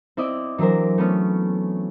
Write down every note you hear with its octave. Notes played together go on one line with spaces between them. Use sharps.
C4 E4 D5 D#5
E3 F#3 D4 A#4 C5
A3 B3 C#4